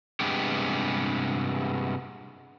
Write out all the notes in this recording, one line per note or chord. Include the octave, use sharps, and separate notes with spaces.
G2 C3 G#3 B3 G4